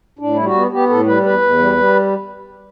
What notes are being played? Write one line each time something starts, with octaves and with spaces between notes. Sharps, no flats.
A2 D4
G3 E4
F#4
B3
B3 G4
A2 A4
G3 B4
E2 B4
E2
G3
G3